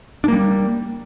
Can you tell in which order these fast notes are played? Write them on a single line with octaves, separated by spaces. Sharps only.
D4 A#3 G3